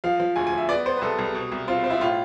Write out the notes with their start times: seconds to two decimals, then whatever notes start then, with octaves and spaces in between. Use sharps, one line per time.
0.04 F3 F5
0.20 F3
0.36 D2 G#5
0.47 G#5
0.52 F3
0.58 E5
0.69 B3 D5
0.86 B3 C5
0.97 B4
1.01 C2 A4
1.18 C2
1.35 B2
1.52 C2
1.68 C4 F4
1.84 C4
1.90 E4
2.00 A2 F4